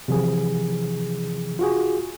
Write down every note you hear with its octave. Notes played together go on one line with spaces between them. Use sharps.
C3 E3 F3 G#4
F4 F#4 G#4